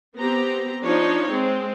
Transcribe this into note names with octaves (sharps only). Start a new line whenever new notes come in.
B3 C4 G4 A#5
F3 D4 D#4 C#5
G#3 C4